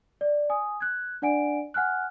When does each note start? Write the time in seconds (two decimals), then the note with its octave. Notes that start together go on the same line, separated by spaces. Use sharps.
0.21 D5
0.50 G#5 D#6
0.80 F#6 G#6
1.22 D4 D5 F#5 G#5 D7
1.74 F#5 G#5 F6 F#6